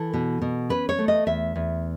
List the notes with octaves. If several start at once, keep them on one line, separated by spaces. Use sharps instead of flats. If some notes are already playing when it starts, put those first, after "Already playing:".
Already playing: E3 A4
B2
B2
C#4 B4
C#5
A3
D#5
E2 E5
E2